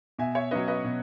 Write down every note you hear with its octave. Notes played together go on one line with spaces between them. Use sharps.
B2 E5 G#5
C#5 E5
F#3 C#4 B4 D#5
B4 D#5
B2